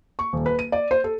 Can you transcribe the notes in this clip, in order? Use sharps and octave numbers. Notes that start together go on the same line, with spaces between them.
C#6
D#1
B4
D#7
D5
C5
A4